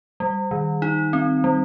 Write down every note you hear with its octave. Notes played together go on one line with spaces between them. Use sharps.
G3
D#3
D#4
C4
G3